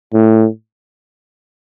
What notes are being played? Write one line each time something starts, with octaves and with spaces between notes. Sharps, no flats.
A2